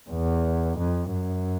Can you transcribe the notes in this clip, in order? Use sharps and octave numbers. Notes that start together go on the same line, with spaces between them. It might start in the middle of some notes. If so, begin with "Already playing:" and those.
E2
F2
F#2